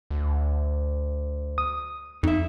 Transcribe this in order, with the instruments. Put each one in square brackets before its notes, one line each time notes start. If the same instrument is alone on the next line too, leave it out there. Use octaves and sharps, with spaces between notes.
[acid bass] D2
[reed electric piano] D#6
[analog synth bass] F2 [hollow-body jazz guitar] D#4 E5